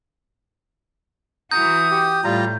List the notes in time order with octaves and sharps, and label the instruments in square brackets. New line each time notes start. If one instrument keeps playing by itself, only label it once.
[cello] E3 F#4 [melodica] A#5 [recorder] D#6 [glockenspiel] G6
[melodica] G4
[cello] A2 [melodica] G3 F4 A#5